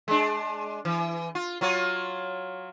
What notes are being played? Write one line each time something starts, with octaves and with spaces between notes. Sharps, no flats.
G#3 D4
E3
F4
F#3 F4 C#5